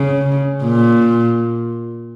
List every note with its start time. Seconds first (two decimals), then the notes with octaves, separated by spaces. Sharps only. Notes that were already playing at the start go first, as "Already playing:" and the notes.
Already playing: C#3
0.63 A#2